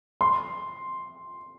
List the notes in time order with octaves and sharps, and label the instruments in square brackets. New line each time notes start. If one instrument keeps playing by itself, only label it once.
[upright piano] C6